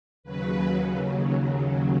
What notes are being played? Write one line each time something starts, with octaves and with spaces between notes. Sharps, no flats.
D#2 C#3 F#3 B4